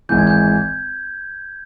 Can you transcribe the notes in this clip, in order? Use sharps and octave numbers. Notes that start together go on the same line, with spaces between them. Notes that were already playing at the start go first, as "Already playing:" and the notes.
G#1 G#2 E3 G6
G#6
G6